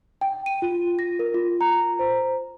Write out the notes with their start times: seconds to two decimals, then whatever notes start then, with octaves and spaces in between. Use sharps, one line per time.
0.21 G5
0.46 D#7
0.62 F4
0.99 A#6
1.19 A#4
1.34 F4
1.61 A#5
1.99 C5